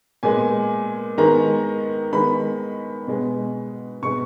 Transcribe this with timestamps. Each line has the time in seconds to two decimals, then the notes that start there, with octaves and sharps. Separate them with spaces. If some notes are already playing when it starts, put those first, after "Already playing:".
0.23 A#2 G#3 B3 G#5
1.18 D#3 G#3 B3 A#5
2.12 D#3 G#3 B3 B5
3.07 B2 G#3 B3
4.03 B2 G#3 B3 C#6